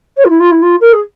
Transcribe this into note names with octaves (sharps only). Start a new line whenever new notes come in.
C#5
F4
E4
F4
E4
F4
A#4
G#4